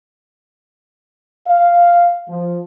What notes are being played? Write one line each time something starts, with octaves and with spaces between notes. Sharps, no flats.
F5
F3